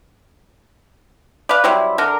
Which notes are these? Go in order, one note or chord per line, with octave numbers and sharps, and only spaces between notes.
B4 D5 F5
F#3 G3 C4 E4
D3 A#4